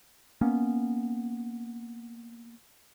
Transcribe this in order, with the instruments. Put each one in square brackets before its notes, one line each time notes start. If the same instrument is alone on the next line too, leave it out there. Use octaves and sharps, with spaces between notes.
[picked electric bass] A#3 B3 C#4